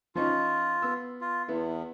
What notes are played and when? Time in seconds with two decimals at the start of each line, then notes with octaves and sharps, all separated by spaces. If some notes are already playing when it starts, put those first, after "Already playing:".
0.15 F3 C#4 D#4 F4
0.82 B3 E6
1.21 F4
1.48 E2 B3 E4